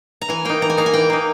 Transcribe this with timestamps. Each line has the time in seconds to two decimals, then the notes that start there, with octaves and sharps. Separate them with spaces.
0.21 A#5
0.29 E3 G#5
0.45 A#3 D#4 G5
0.62 E3 A#5
0.70 G#5
0.77 A#3 D#4 A#5
0.86 G#5
0.93 E3 G5
1.10 A#3 D#4